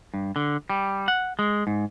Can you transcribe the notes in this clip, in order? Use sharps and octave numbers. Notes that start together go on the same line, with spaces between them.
G2
D3
G3
F#5
G#3
G#2